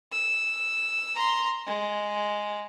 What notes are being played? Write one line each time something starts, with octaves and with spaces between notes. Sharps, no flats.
E6
A#5 C6
G#3